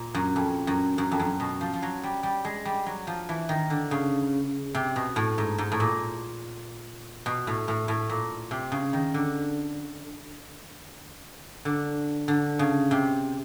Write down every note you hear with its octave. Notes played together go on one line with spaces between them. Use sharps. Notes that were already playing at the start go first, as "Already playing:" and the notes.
Already playing: A#2
F#2
F2
F#2
F#2
F2
F#2
B2
F3
F3
F#3
G3
G3
G#3
G3
F#3
F3
E3
D#3
D3
C#3
C3
B2
A2
G#2
G#2
A2
A#2
B2
A2
A2
A2
A#2
C3
C#3
D#3
D3
D3
D3
C#3
C3